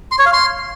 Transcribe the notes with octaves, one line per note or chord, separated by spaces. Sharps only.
C6
C#5
F5
C6